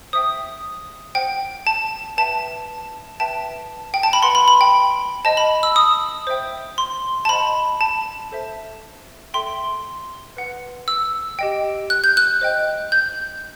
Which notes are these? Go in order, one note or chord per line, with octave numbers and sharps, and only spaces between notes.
C5 E5 G5 D#6
C5 F#5 G5
A5
B4 E5 G5 A5
B4 E5 G5 A5
G5
A5
B5
B4 F#5 C6
B5
B5
G5
C5 D#5 G5 A5
B5
E6
D#6
C5 E5 G5
C6
A5
C5 D#5 F#5 B5
A5
A4 C5 E5
A4 E5 G5 C6
B4 F#5
E6
G4 D#5 G5
F#6
G6
F#6
C5 D#5 G5
G6